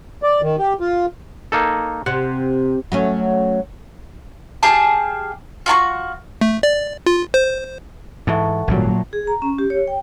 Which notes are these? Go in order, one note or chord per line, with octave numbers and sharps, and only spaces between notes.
D5
D#3
G4
F4
A#3 D#4 A4
C3 F#5
F#3 A3 C#4
G4 G#4 F5 A5
F4 F#4 A5 C#6
A3
D5
F4
C5
G#2 E3 A3 F#5 A5
G#1 F#2 A#2 F#3 G3
G#4
A#5
C#4
G4
C#5
G5